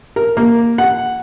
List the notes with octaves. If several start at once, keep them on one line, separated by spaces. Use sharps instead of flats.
A#4
A#3
F#5